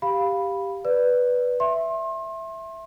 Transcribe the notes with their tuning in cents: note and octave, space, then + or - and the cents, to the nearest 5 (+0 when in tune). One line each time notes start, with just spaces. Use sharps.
G4 +5 F5 +0 B5 -5
B4 +0 D5 +0
E5 +0 C6 +35